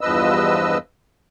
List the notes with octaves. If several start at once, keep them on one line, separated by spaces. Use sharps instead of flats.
E2 G2 F3 B4 D#5 E6